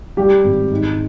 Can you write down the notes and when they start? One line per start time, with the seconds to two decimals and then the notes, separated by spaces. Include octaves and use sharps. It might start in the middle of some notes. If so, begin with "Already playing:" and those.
0.17 G3 G4
0.44 G#1
0.71 G#2